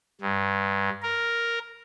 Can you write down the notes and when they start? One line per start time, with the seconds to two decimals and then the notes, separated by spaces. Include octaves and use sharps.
0.21 G2
1.02 A#4